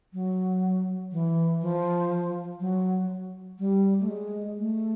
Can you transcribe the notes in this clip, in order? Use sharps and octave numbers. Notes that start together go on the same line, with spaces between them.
F#3
E3
F3
F#3
G3
A3
G#3
A3